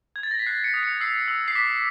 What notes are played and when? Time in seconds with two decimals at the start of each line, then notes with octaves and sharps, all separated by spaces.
0.16 G#6
0.23 A6
0.31 A#6
0.39 B6
0.46 F#6 C7
0.64 C#7
0.74 D#6
0.83 C#7
1.01 E6 C7
1.28 E6
1.48 C7
1.55 D6 B6